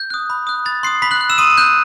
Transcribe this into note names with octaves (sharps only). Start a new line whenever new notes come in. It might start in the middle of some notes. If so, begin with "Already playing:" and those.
Already playing: G6
D#6 F#6
B5
D#6 F#6
B5 A6
C6 D#6 F#6 C7
B5 C6 B6
F#6 F#7
F#6
E6 E7
C6 D#6 D#7
F#6 G6